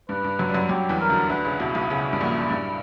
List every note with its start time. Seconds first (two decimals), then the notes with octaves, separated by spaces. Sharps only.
0.09 G2 B4
0.24 G2
0.39 F#2 F#3
0.49 G3
0.55 F#2 F#3
0.69 F#2 F#3 G4
0.89 E2 E3
1.00 A#4
1.09 D2 D3
1.30 D2 D3 B4
1.45 C#2 C#3
1.60 B1 B2 E4
1.75 B1 B2
1.90 C#2 C#3
2.13 G2
2.21 A#1 A#2
2.50 G2